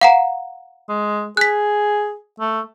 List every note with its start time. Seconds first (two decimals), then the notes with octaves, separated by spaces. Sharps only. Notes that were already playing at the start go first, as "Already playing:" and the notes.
0.01 F5 F#5 A#5
0.89 G#3
1.37 G#4 F#6 B6
2.40 A3